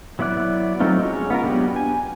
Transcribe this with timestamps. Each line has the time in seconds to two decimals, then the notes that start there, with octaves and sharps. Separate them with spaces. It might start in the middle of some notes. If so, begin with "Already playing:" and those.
0.19 F#3 B3 E4 D5 F#6
0.80 F#3 A3 C4 D#4 F4
1.03 G#3 C#4 C#5
1.30 B3 F4 A#4
1.44 F#3 B3 D4 G4
1.76 G#5